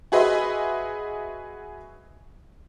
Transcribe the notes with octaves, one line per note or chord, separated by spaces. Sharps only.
F#4 G#4 B4 D#5 E5 C6